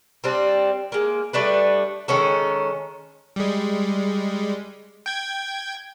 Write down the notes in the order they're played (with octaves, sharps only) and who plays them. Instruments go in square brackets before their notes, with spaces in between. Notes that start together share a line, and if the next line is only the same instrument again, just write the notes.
[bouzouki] G3 C4 D4
G#3 A#3
G3 A3 D4 B4
D#3 G#3 C#4 A4
[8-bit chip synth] G3 G#3
G5 G#6